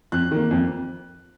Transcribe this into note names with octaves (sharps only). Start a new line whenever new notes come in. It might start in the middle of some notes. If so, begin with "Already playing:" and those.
F2 F#6
D#3 A#3
F2